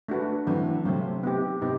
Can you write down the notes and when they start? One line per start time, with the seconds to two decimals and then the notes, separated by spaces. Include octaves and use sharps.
0.08 A3 D4 F#4 B4
0.47 D3 E3 F#3 A3 C4
0.85 C3 F#3 A3 C4
1.23 B3 D#4 G4
1.62 C3 B3 D#4 G4